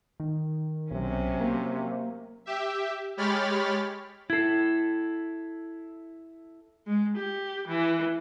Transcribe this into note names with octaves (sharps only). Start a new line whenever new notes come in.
D#3
B1 C3 F#3 C#4
A#3
G4 E5
G#3 G4 C#5 B5 F6 A6
E4 A4 G#6 C7
G#3
G4
E3